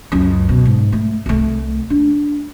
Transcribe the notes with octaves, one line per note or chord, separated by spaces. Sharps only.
C#2 F#2
B2
G#2
A3
C2 A3
D4